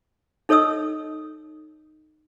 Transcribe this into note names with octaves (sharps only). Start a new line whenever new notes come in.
D#4 A4 C#5 D#5 D#6 E6